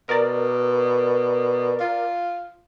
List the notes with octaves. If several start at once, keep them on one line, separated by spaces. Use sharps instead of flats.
B2 A#4 D5
F4